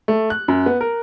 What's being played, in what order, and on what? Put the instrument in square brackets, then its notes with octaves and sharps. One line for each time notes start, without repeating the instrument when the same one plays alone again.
[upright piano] A3
F#6
F#2
B3
A#4